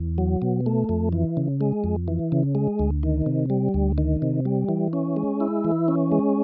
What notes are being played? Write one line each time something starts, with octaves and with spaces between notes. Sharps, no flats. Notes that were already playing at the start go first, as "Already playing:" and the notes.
Already playing: E2
F#3
B2
A3
F2
E3
C#3
G#3
F2
E3
C#3
G#3
D2
D#3
C3
G3
D2
D#3
C3
G3
E3
C#4
G#3
E4
E3
C#4
G#3